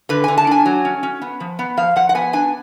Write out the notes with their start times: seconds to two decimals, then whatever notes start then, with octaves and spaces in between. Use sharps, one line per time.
0.09 D3 B4
0.24 D3 G#5
0.38 A5
0.47 D4 G#5
0.66 F#3
0.85 C#4
1.03 C#4
1.22 B3
1.40 F3
1.59 B3
1.77 F3 F5
1.96 F3 F#5
2.09 F#5
2.15 B3 G#5
2.33 D4 G#5